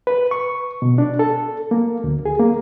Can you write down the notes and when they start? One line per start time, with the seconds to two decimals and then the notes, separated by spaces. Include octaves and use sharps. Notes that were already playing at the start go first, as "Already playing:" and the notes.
0.07 B4
0.31 C#6
0.82 B2
0.98 D4
1.19 A4
1.71 A#3
2.04 D2
2.26 G#4
2.40 A#3